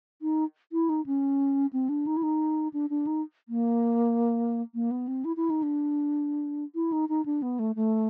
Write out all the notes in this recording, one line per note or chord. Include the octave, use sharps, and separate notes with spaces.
D#4
E4
D#4
C#4
C4
D4
D#4
E4
D#4
D4
D4
D#4
A#3
A#3
B3
C4
E4
E4
D#4
D4
E4
D#4
D#4
D4
B3
A3
A3